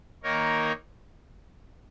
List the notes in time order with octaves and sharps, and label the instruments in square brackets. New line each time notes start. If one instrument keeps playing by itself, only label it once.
[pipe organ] D#3 A#3 D#4 A#4 C#5